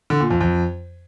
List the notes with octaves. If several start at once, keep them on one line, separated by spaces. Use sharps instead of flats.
D3
A#2
F2
F2